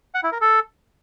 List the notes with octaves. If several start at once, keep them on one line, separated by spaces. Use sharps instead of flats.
F#5
E4
A#4
A4